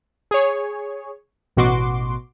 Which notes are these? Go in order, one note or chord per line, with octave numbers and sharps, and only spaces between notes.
G#4 C#5
A1 B2 F#4 C6 D6